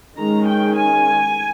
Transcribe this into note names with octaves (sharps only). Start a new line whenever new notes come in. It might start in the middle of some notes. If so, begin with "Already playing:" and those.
D#3 G#3 C#4 A#5
G5
G#5